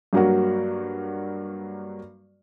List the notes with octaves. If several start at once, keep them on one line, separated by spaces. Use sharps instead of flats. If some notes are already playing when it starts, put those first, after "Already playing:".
G2 F#3 A#3 F#4